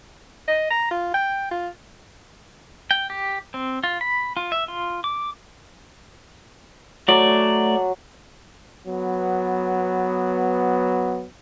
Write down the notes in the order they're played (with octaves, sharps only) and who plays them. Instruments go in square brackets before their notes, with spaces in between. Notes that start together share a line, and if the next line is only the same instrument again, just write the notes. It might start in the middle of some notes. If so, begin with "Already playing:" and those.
[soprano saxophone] D#5
A#5
F4
G5
F4
[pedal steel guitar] G5
G4
C4
F4
B5
F4
E5
F4
D6
[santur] F#3 [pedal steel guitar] A3 D5
[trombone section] F#3 B3